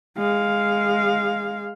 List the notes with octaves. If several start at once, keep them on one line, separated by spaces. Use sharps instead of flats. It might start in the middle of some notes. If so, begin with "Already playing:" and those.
G#3 F5